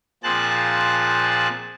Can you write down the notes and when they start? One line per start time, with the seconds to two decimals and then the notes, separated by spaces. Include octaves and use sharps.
0.23 A#2 F3 C4 G#4 A5 F#6